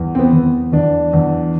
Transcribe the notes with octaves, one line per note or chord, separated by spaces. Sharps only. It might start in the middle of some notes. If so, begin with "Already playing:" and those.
Already playing: E2
C4
B3
E2
E2 D4
E2